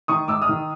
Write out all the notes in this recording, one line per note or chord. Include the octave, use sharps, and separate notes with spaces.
D#3 C#6 D#6
G#2 D6 E6
D#6 F6
D#3